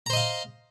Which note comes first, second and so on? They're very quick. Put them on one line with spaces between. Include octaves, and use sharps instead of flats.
A#5 C5 D#5 F5